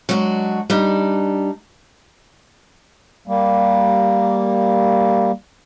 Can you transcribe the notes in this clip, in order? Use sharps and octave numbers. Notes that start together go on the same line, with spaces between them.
F#3 G#3 D4 F#4
G3 D4 D#4
G3 A#3